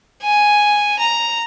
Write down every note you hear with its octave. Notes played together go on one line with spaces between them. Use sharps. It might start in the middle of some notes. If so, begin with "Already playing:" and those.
G#5
A#5